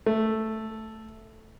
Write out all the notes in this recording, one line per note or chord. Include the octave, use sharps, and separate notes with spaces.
A3